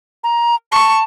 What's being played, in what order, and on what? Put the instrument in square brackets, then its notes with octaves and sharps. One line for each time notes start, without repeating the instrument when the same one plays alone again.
[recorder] A#5
[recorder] A5 [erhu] C#6